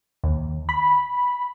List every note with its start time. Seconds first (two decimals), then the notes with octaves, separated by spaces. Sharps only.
0.24 D#2
0.69 B5